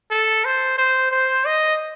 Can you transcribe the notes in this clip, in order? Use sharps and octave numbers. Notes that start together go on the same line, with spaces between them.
A4
C5
C5
C5
D#5